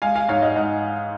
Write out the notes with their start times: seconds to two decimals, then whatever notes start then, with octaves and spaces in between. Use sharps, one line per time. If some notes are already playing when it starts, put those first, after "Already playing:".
0.02 G#3 F5 G#5
0.16 F5 G#5
0.29 G#2 C#5 F5
0.42 D#5 F#5
0.56 G#2 D#5 F#5